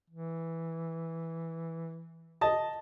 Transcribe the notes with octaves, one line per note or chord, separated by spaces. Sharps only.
E3
D#5 A5